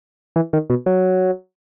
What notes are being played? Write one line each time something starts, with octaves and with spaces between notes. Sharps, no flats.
E3
D#3
B2
F#3